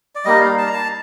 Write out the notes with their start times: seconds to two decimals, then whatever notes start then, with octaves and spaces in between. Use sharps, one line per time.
0.15 D5
0.25 G3 A#3 D#4 D#5
0.41 F5
0.58 A5
0.67 A#5
0.73 A5